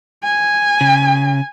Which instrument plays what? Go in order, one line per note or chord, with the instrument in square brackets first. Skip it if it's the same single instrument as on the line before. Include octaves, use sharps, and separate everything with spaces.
[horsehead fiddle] G#5
[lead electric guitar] C#3